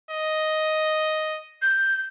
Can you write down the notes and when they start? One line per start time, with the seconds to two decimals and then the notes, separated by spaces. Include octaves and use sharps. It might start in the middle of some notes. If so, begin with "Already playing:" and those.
0.10 D#5
1.62 G6